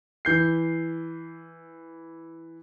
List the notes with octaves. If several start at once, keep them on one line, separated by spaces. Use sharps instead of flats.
E3 G6 C7